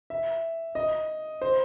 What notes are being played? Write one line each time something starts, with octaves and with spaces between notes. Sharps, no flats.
E5
D#5
C5